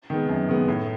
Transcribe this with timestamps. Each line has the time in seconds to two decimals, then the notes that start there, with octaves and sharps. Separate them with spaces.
0.10 D#3 G#3 B3
0.29 F#2
0.49 D#3 G#3 B3
0.68 A2